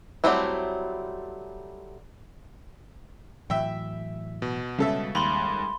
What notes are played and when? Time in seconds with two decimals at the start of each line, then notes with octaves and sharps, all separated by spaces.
0.24 F#3 G3 A3 C4 E4
3.50 A2 E3 F#3 E5 G5
4.42 B2
4.78 C#3 G3 G#3 A4 E5
5.15 D#2 B5 C6 G7